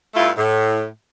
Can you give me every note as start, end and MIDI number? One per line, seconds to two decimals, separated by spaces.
0.15 0.30 43
0.15 0.30 57
0.15 0.30 64
0.15 0.30 65
0.37 0.85 45